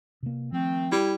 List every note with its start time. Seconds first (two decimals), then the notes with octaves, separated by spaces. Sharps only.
0.23 C3 A#3
0.52 D#3 F3 A3 C4
0.92 G3 E4